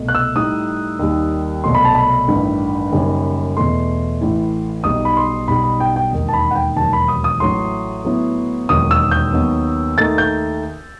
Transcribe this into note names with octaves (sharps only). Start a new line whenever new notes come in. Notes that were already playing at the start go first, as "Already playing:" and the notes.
Already playing: C2 B2 A3
F#6
E6
A2 G3 D#4 D#6
D#2 D#3 G3
C2 B2 F#3 A3 C6
B5
A5
B5
A1 G2 D#3
F#1 F#2 D#3 G3
E2 B2 A3 C6
A1 A2 E3
B1 B2 G3 D#4 D#6
B5
C6
B1 B2 G3 D#4 B5
B5
G5
G5
E1 D#2 D#3
A5
B5
F#5
G5
E1 D#2 D#3 F#3 A5
B5
D#6
D#6
A1 A2 F#3 A3 C6
A2 F#3 B3 E4
E1 D#2 D#3 F#3 D#6
E6
G6
D#2 D#3 F#3 B3
D#2 D#3 A3 D#4 A6
G6